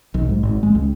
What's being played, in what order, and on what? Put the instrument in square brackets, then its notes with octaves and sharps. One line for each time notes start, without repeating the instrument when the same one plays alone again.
[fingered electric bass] B1
G#2
G#1
G#3
C#2